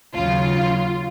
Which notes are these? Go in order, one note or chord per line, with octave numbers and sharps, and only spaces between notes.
D#2 C#3 F#3 F4